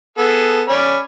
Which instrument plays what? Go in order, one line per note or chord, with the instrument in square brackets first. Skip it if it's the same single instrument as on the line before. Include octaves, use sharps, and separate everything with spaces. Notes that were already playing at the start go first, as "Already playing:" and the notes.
[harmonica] B3 G#4 A4
C#4 D5 B5